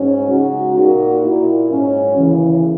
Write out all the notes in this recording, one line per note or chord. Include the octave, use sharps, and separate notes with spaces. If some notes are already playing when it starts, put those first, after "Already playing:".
Already playing: G#2 F#3 C#4
C#3 G#3 D#4 F#4
A#2 A#3 D#4 F#4
A#2 A#3 E4
G#2 F#3 C#4
D#2 C#3 E3